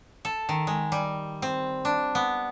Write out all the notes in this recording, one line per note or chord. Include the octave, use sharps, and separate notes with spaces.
A4
D#3
G#3
G3
C4
D4
B3